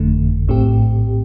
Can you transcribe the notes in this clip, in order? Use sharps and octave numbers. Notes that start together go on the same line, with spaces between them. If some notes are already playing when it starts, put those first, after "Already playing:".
Already playing: G1 F2 D3 A3
A#1 A2 A3 C4 G4